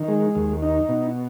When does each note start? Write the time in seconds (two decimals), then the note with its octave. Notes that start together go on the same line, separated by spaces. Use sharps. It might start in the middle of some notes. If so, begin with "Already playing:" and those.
Already playing: D#3
0.08 G#3
0.35 D#2
0.62 D#4
0.89 B2